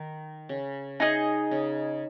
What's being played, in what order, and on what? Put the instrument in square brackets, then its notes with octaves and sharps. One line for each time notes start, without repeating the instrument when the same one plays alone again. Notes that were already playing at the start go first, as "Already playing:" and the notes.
Already playing: [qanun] D#3
C#3
[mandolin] D#4 G#4 D#5
[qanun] C#3